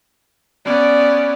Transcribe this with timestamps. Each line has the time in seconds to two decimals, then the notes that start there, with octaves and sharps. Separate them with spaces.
0.66 B3 C#4 D5